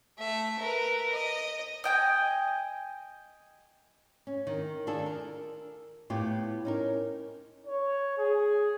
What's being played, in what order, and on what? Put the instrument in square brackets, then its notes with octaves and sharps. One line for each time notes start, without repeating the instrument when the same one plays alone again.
[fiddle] A3 E5
A#4 B4
D#5
[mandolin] D#5 G5 G#5
[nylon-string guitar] C#4
D#3
D4 F4 G#4 A4
A#4
A2 B3 F4 G4
C#4 D#4 A#4
[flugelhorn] C#5
G#4